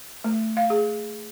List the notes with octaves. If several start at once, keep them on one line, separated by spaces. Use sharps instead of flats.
A3
F5
G#4